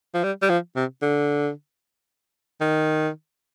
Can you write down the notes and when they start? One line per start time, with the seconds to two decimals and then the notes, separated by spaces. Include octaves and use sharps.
0.15 F3
0.23 G3
0.42 G3
0.49 F3
0.76 C3
1.02 D3
2.61 D#3